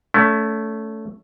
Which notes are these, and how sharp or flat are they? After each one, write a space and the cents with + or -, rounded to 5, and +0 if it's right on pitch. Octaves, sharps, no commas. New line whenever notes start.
A3 +0 C#4 +35